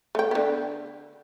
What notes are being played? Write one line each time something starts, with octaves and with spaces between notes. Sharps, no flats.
A3 G5
D3 B3